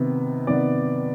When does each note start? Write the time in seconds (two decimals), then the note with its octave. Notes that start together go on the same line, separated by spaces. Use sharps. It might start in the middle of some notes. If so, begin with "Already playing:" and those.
Already playing: C3 D#3 B3
0.47 C3 D#3 B3 D5